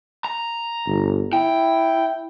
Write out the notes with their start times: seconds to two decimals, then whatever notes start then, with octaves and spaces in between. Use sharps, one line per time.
0.25 A#5
0.87 G1
1.33 E4 G5